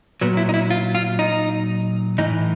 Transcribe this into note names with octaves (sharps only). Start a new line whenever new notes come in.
A#2 F#3 B3
E4
D#4
E4
F4
F4
D#4
A2 E3 D#4